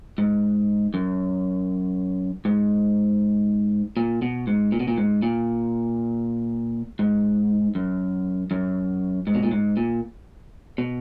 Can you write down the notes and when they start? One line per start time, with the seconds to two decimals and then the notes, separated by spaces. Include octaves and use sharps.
0.18 G#2
0.94 F#2
2.45 G#2
3.97 A#2
4.22 B2
4.47 G#2
4.72 A#2
4.80 B2
4.88 A#2
4.98 G#2
5.22 A#2
6.99 G#2
7.75 F#2
8.51 F#2
9.27 G#2
9.35 B2
9.43 A#2
9.52 G#2
9.77 A#2
10.78 B2